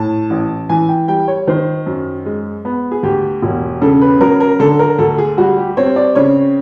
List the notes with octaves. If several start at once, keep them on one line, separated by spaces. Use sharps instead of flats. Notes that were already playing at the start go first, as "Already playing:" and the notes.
Already playing: A2 A5
A1
E3 G#5
G5
G3 G5
C#5
D#3 C5
F#2
G#3
B3
G#4
D2 G4
E1
C#3 A4
B4
F#3 A#4
A#4
D3 A4
A#4
D2 A4
G#4
G3 F#4
G4
C4 C#5
D5
C#3 C#5